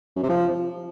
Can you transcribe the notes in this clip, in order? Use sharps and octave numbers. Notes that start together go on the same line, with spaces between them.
F#2
C3
F3